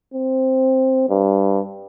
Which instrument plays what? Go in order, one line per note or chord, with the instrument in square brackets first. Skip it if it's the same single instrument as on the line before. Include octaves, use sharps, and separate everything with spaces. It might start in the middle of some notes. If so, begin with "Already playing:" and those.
[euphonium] C4
G2